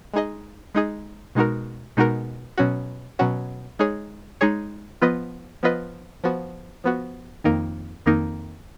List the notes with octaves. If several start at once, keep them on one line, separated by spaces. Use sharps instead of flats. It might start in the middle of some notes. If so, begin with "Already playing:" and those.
G#3 D#4 G#4 D#5
G#3 D#4 G#4 D#5
B2 G#3 D#4 F#4 A#4
B2 G#3 D#4 F#4 A#4
B2 F#3 C#4 F#4
B2 F#3 C#4 F#4
G#3 D#4 G#4 C#5
G#3 D#4 G#4 C#5
F3 B3 F4 B4 D#5
F3 B3 F4 B4 D#5
F3 B3 F#4
F3 B3 F#4
F2 D#3 A#3 D#4 A#4
F2 D#3 A#3 D#4 A#4